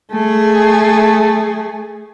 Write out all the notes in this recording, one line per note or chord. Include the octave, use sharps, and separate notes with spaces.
A3 G#4